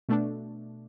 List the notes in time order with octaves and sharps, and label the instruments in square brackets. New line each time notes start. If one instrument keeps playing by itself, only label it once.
[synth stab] B2 A3 D4